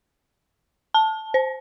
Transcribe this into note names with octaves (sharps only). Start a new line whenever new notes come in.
A5
C5